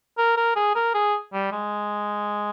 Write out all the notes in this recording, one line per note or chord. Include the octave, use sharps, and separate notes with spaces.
A#4
A#4
G#4
A#4
G#4
G3
G#3